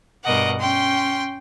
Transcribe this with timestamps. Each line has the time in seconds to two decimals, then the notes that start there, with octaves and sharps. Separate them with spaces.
0.23 G2 B2 A#4 D#5 F#5 D6
0.60 C#4 G5 C6